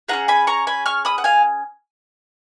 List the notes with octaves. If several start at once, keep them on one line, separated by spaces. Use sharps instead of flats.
C#4 F4 G#4 F#5 A#5
G#5 B5
A#5 C#6
G#5 B5
C#6 F6
B5 D#6
F#5
F5 G#5